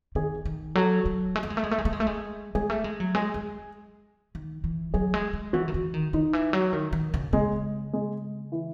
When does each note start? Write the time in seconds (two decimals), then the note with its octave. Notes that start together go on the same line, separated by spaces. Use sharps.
0.15 D#3 G#4
0.45 D#3
0.75 F#3 A4
1.06 F#3
1.36 G#3
1.43 A3
1.50 G#3
1.57 A3
1.64 G#3
1.71 A3
1.78 G#3
1.85 A3
1.93 G#3
2.00 A3
2.07 G#3
2.55 G#3 G#4
2.70 A3
2.84 G#3
3.00 F#3
3.15 G#3 G#4
3.34 G#3
4.35 D#3
4.64 E3
4.94 F#3 G#4
5.14 G#3
5.33 G#3
5.53 E3 F#4
5.68 D#3
5.74 E3
5.94 D#3
6.13 D#3 D#4
6.33 E3
6.53 F#3
6.73 D#3
6.93 D#3
7.14 C#3
7.33 C#3 G#3
7.93 G#3
8.52 E3